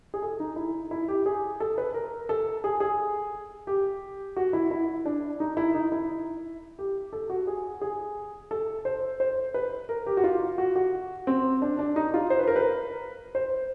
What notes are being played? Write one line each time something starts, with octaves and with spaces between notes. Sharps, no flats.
G#4
A4
D#4
E4
E4
G4
G#4
A4
B4
A#4
A4
G#4
G#4
G4
F#4
E4
E4
D4
D#4
E4
D#4
E4
G4
A4
F#4
G#4
G#4
A4
C5
C5
B4
A#4
G4
F#4
F4
F#4
F#4
C4
D4
D4
D#4
F4
C5
B4
A#4
B4
C5